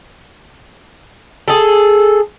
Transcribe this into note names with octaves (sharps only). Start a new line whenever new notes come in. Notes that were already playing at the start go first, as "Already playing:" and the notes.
G#4 A4